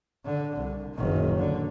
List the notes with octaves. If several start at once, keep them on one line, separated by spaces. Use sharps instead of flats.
D3
C2
F#1 D#3
D3